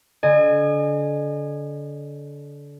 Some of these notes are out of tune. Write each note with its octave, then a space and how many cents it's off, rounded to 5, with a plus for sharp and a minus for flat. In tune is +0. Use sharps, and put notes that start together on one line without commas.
D3 -30 D#5 -40 G#5 +0